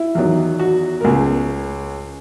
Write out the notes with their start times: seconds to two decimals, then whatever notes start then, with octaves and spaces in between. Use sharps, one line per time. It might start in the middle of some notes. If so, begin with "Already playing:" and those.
Already playing: E4
0.15 E2 D#3 F#3
0.59 F#4
1.01 A#4
1.04 C#2 C#3 G#3 G#4